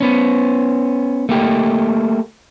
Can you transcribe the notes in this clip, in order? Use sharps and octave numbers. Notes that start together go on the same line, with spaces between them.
B3 C#4
A3 A#3 G4